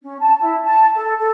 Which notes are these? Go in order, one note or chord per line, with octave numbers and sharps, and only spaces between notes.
C#4
A5
E4
A5
A4
A4